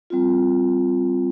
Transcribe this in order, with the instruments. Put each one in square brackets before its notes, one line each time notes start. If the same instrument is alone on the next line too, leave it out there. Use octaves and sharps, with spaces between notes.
[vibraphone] G3 C4 F4